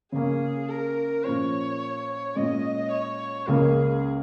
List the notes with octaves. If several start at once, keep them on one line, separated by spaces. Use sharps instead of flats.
C#3 A#3 C#4 G#4
A#4
A#2 F3 C#4 C#5
A#2 G#3 C#4 D#5
C#5
C#2 C#3 A#3 C#4 G#4 A#4